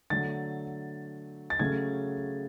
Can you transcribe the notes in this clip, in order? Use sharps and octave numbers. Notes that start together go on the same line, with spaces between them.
D3 F#3 A3 A6
A6
C#3 F#3 A3 C#4 G#6